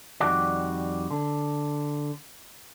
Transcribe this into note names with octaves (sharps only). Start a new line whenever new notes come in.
F2 D#3 G3 F#4 D5
D3